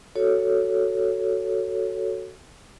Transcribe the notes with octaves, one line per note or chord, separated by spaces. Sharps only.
F#4 A4 C#5